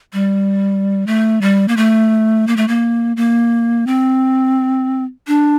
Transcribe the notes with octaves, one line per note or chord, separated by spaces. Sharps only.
G3
A3
G3
A#3
A3
A#3
A3
A#3
A#3
C4
D4